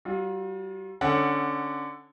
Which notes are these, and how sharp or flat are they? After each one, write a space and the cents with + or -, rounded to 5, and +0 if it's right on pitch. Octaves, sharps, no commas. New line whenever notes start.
G3 -40 F4 +35
D3 +0 C#4 -10 F#5 +0